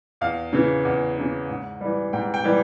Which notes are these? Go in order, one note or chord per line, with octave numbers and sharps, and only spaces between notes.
E2 F5
C#3 E3
E2
C#3 E3
G#2
E3 G3
G#2 G5
G5
E3 G3